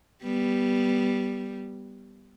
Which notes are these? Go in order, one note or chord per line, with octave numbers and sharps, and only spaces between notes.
G3 B3